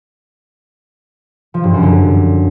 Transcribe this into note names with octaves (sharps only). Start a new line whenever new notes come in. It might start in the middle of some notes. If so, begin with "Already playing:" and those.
F3
G2
F#2
D3